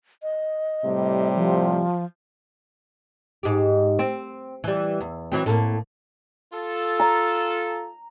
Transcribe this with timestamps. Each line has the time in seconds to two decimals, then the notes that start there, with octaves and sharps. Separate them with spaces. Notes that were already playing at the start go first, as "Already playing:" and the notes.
0.23 D#5
0.85 A2 C3 G3
1.36 F3
3.43 G#2 G4
3.99 C4
4.64 E3 G3
5.01 E2
5.32 E3 F#3 C4
5.46 A2 A#3
6.53 F4 A4
7.00 A#5